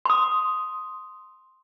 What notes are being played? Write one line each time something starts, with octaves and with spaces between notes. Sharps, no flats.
C6 D#6